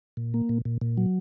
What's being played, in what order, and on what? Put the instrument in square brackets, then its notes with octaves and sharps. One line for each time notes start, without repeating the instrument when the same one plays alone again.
[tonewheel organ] A#2
A#3
A#2
A#2
A#2
F#3